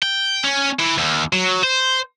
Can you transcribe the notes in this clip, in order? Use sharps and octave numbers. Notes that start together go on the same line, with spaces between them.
G5
C#4
E3
D#2
F#3
C5